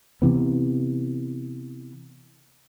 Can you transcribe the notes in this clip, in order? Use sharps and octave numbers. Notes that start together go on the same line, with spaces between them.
C3 E3 B3